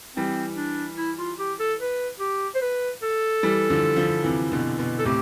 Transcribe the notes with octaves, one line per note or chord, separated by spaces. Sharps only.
E3 G3 C4
D4
E4
F4
G4
A4
B4
G4
C5
B4
A4
E3 G3
D3 F3
D3 F3
C3 E3
B2 D3
B2
A4
A2 C3 G4